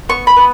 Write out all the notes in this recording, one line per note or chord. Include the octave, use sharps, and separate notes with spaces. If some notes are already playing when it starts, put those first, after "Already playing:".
B3 C#6
B5
B3